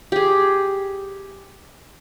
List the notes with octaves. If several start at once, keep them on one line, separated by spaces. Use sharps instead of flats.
G4 G#4